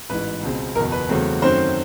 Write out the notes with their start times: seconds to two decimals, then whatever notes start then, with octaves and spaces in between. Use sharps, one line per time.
0.10 A1 G#2 E3 B4
0.43 C#2 B2 G#3 C4
0.76 F#1 E2 B2 A#4
0.92 B4
1.09 E2 C#3 F#3 A3 C4
1.42 F#2 D#3 F#3 A3 C4 C5